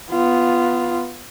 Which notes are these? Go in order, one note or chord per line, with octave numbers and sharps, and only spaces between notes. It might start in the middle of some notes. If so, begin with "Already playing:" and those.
B3 F4